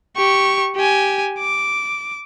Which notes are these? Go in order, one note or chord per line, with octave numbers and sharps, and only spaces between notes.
G4 C#6
G4 G#5
D6